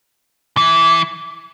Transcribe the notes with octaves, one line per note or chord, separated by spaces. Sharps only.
E3